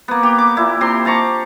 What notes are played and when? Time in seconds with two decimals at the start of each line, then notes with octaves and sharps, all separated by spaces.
0.08 A#3 B3
0.23 G4
0.38 D6
0.57 A#2 E4
0.81 C3 G4 C6
1.05 F5 A5 A#5 C#6